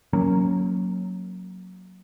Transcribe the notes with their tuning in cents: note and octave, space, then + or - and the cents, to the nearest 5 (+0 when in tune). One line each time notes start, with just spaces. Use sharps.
F#3 -5 A#3 +0 C#4 +0